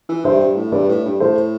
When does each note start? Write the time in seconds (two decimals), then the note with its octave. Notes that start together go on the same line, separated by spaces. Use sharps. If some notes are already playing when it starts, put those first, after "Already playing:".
0.09 E3
0.25 G2 C5 E5
0.41 G2
0.57 A2
0.72 G2 B4 D5
0.89 A2
1.05 G2
1.20 A2 A4 C5